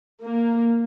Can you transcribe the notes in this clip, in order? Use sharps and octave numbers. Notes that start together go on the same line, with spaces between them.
A#3